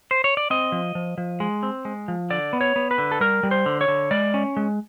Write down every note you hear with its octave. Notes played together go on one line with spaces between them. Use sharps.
C5
C#5
D5
C4 D#5
F3
F3
F3
G#3
C4
G#3
F3
D3 D5
B3
C#5
B3
B4
D3
A4
G3 A#4
G3
C5
D3
C#5
D3
G#3 D5
C#4
G#3